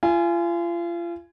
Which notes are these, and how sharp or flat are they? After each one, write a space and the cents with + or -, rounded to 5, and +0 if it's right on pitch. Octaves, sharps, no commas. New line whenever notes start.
F4 -35 G#5 +0